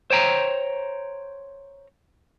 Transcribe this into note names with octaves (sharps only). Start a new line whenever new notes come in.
C5 C#5 G5 A#5